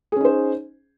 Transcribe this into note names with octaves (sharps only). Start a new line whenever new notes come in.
C#4 D#4 G#4 C5